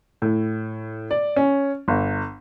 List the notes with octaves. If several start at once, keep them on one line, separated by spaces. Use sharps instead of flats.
A2
D5
C#4
G1